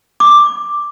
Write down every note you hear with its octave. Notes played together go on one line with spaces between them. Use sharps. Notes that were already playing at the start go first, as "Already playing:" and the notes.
D6